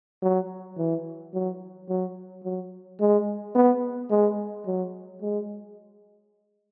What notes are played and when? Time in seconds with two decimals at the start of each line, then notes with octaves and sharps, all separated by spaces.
0.23 F#3
0.78 E3
1.34 F#3
1.89 F#3
2.44 F#3
3.01 G#3
3.55 B3
4.11 G#3
4.67 F#3
5.22 G#3